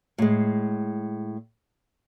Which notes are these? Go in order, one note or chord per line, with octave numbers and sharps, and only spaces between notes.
A2 G#3